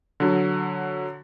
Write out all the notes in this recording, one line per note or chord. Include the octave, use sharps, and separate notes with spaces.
D3 F#3